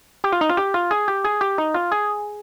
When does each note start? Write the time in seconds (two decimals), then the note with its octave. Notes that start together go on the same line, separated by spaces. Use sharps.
0.24 G4
0.32 F4
0.41 D#4
0.50 F4
0.57 G4
0.74 F4
0.91 G#4
1.08 G4
1.24 G#4
1.41 G4
1.58 D#4
1.74 F4
1.92 G#4